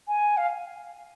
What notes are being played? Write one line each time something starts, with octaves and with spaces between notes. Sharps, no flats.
G#5
F5